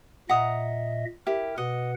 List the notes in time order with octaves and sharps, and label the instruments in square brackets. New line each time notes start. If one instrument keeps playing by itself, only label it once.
[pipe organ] A#2 D#5 E5 [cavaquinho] F#5 A#5 D#6
[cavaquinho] E4 G4 [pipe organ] A#4
[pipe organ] B2 B4 F#5 [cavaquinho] D#5